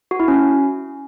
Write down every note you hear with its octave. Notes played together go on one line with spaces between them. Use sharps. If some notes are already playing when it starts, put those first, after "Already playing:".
F#4
E4
C#4